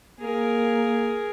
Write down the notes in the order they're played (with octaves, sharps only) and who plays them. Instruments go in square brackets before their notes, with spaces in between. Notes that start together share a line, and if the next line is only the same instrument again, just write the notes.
[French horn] A#3 [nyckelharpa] G#4 A#4